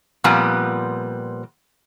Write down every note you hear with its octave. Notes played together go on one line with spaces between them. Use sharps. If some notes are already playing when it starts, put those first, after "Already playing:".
A#2 F3 G3 B3 C4